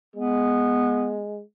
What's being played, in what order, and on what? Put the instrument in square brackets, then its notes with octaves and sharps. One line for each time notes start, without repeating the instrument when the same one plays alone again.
[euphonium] G#3 [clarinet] B3